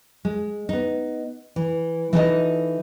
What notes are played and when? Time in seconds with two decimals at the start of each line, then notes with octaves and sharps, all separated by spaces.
0.25 G#3
0.69 B3 D#4
1.56 E3
2.13 E3 D#4 F4 G#4 A4 D#5